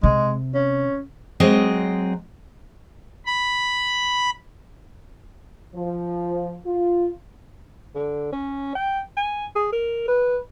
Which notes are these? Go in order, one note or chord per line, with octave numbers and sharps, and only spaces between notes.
C3 G#3
C#4
F#3 G#3 C4 D#5
B5
F3
F4
D3
C#4
G5
G#5
G#4
A#4
B4